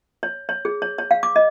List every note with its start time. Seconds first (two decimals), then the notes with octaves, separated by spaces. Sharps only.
0.23 C#5
0.49 C#5
0.65 G#4
0.82 C#5
0.98 C#5
1.11 F5
1.23 D6
1.36 D#5